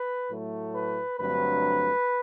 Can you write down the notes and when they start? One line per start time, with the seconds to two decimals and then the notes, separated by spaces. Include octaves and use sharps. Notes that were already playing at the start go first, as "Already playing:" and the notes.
Already playing: B4
0.29 A2 F#3 A3
0.74 B4
1.19 G2 D3 F#3 A3 C4 B4